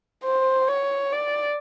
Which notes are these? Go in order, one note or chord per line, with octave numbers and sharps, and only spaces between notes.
C5
C#5
D5